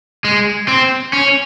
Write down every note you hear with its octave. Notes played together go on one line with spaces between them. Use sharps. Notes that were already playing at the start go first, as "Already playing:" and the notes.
G#3
C4
C#4